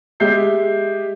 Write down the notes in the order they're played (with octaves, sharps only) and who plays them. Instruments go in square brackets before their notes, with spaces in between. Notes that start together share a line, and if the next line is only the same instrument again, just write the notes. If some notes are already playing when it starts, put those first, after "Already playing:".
[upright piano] G#3 G4 E5 G6 C7